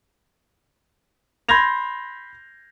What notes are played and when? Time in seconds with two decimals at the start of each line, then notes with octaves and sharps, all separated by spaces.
1.49 B5 C6 G6 G#6 A#6 F7